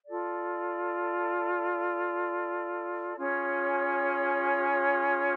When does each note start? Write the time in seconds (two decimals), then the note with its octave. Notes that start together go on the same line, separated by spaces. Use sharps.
0.06 F4 A4 D5
3.17 C#4 F4 G#4 C#5